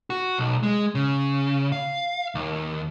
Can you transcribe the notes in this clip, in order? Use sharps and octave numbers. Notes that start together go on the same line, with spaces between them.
F#4
B1
G#3
C#3
F5
D#2